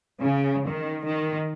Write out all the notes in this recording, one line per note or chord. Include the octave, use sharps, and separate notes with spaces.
C#3
D#3
D#3